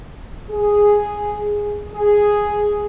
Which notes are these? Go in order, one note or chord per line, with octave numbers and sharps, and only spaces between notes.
G#4
G#4